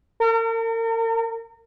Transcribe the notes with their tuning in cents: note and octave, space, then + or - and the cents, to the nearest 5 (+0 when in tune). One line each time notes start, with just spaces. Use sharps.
A#4 -40